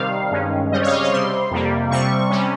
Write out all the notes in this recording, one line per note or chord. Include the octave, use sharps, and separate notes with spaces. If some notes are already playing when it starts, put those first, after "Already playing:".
Already playing: C3 D#3 G3 C4 F5
G2 D#3 G#3 C#4
C#3 G3 C4 D#5
C#5
F5
D#5
C#5
C3 G3 C4 C6
F2 C3 G3 A#3
C3 G3 C4 C#6
C3 G3 C#4